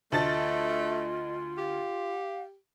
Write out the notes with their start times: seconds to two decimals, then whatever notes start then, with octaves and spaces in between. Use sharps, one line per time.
0.12 D2 A3 F4 D#5 A5 A6
1.58 G4 F5